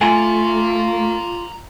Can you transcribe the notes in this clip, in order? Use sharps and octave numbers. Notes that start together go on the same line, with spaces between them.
A3 F4 F5 G#5 A#5